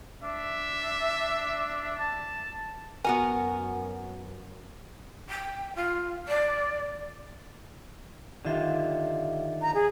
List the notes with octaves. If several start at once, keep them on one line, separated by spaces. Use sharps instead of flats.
D4 E5
A5
F#2 B3 F#4 A#4 G#5
G5
F4
D5
D3 D#3 F4 G4 E5 F5
A#5
G#4